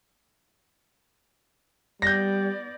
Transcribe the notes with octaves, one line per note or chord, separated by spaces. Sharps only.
G3 B3 D5 G6 A#6